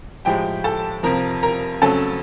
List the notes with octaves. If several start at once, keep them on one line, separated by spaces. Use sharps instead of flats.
A2 F3 G#3 G4 G5
A4 A5
F2 C3 F3 A#4 A#5
A#4 A#5
F2 C#3 F#3 A3 A4 A5